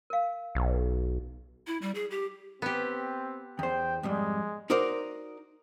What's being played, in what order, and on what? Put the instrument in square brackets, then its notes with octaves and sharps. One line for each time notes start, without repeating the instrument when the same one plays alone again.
[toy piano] A#4 F5
[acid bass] B1
[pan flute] E4
G3
G#4
G4
[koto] B3 G4 [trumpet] C4
[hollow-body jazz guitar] E2 C5 [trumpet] G5
[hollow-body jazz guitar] F2 G#2 G3 [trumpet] G#3
[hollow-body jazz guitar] D#4 F#4 A#4 C5 D5